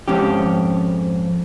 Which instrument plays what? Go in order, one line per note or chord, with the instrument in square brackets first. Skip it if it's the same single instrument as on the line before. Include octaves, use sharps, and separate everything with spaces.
[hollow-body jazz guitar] F2 G#2 C#4 G4